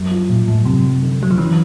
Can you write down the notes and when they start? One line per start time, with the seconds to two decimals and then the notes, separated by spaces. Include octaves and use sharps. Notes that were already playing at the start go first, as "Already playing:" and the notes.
Already playing: F#2
0.11 F3
0.29 A#2 F3
0.47 F#2 A2
0.65 F#2 C3
0.84 F#2
1.02 D3
1.20 F#2 F#3
1.31 F3
1.38 E3 C#4